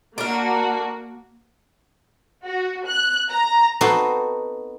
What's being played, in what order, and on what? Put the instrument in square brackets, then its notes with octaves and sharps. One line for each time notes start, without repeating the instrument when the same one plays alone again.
[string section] A#3 F#4 [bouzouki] D4 A#4
[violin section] F#4
F#6
A#5
[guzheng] B3 C4 D#4 F#4 A4 C5